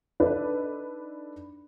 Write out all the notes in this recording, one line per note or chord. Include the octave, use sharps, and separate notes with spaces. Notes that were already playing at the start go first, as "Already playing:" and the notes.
D4 D#4 A4 B4